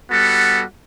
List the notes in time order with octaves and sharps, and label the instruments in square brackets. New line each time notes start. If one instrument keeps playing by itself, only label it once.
[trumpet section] G3 B3 F#4 A4